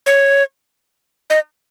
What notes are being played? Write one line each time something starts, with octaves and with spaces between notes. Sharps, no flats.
C#5
D#5